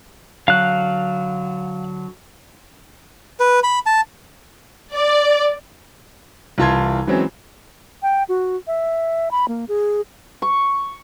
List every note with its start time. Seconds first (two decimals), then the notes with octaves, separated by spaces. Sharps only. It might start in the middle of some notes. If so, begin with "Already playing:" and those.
0.48 D3 F#3 F5 F#6
3.40 B4
3.63 B5
3.86 A5
4.94 D5
6.58 C2 E3 F4 A5 C6 G#6
7.07 E3 F#3 G#3 C4 C#4
8.02 G5
8.29 F#4
8.67 E5
9.31 B5
9.48 A#3
9.69 G#4
10.42 C#6